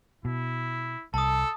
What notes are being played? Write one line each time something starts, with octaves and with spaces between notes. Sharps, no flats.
B2 E4
C2 A4 A5 D#6